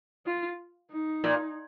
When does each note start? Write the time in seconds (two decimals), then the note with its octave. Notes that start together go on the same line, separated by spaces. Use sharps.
0.26 F4
0.91 D#4
1.24 A#2